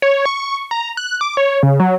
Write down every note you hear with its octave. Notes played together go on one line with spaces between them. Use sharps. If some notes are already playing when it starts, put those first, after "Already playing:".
C#5
C#6
A#5
F#6
D6
C#5
C#3
F#3